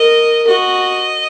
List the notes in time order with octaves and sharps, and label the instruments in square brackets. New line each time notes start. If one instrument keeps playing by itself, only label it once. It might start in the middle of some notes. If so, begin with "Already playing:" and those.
Already playing: [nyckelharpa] A#4 [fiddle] D#5
[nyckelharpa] F#4 [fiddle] D#5